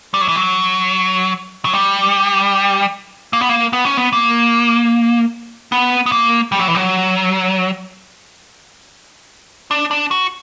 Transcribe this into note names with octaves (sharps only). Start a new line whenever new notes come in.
G3
F#3
E3
F#3
F#3
G3
A#3
B3
A#3
B3
C#4
B3
A#3
B3
B3
A#3
G3
F#3
E3
F#3
D4
D4
F#4